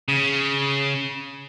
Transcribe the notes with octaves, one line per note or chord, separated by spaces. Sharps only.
C#3